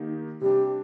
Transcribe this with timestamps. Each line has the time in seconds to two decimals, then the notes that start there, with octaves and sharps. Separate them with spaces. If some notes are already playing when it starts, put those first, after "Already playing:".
Already playing: D#3 A#3 D#4 G4
0.41 C3 G3 D4 G4